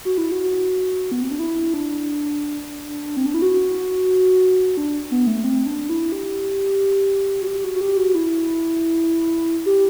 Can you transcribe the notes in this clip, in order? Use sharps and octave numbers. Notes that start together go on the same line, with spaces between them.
F#4
E4
F#4
B3
C4
D4
E4
D4
C4
D4
E4
F#4
D4
B3
A3
C4
D4
E4
G4
F#4
G4
F#4
F#4
G4
F#4
E4
G4